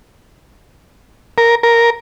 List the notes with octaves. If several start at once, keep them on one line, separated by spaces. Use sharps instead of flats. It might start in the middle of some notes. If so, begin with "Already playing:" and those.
A#4
A#4